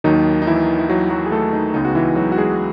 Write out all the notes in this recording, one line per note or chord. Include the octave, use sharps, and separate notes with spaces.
D#2 D#3 F#3 D#4
D#4
E3 E4
E4
F#3 F#4
F#3 F#4
G#4
A3 A4
D#4
C#2 C#3 G#3 B3 D#4
F#4
E3 E4
F#3 F#4
F#4
G#3 G#4